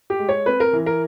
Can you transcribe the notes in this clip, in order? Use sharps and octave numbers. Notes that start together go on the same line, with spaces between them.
G4
G#3
C#5
C4 B4
A#4
E3
A#4